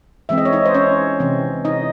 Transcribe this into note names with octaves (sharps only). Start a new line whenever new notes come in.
E3 G#3 C4 E5
D#5
C#5
D#4 D#5
C5
C#4 C#5
C3 E3 C4
D#4 D#5